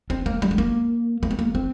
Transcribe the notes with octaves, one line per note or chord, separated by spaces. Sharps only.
C4
A#3
G3
G#3
A#3
A#3
C4
A#3
C4